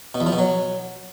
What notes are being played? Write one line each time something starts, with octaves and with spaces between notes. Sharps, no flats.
B2
E2
F3
B2
F#3